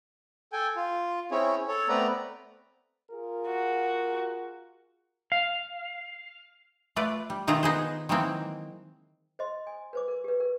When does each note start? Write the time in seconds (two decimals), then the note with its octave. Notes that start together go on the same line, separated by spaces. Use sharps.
0.53 A4 G5 G#5
0.76 F4
1.31 C4 C#4 E4 G#4 C#5
1.68 A4 C#5
1.89 A3 B3 C4 B4 D5 A#5
3.12 F4 G#4 A#4
3.47 F#4
5.32 F5
6.96 A3 F4 B4 D5
7.30 G3
7.47 B2 D#3 A3 F4 G#4 A#5
7.63 B3 D#4 G#4 C5
8.09 D#3 E3 F#3 G#3 A#3 C4
9.39 C5 D#5 C6
9.67 G#5
9.93 B4 C5 D6
10.08 A#4
10.24 G4 B4
10.40 A#4